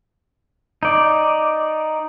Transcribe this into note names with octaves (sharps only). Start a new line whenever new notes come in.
D#4 D5